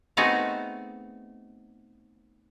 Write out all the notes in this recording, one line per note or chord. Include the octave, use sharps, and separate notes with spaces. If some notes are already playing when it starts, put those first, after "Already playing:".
A3 B3 C4 D#4 F#4 G#4